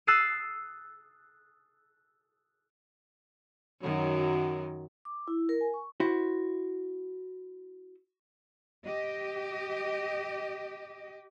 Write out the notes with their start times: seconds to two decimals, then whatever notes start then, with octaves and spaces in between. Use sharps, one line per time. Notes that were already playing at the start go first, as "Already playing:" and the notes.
0.07 D#6 E6 F#6 A6 C7 D#7
3.81 F#2 D#3 F#3
5.05 D6
5.28 E4
5.49 A#4
5.61 G#5
5.74 C#6
6.00 E4 F#4 C5
8.86 G4 D#5